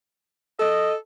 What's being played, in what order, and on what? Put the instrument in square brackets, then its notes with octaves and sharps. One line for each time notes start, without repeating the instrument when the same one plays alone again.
[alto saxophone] A4 [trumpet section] D#5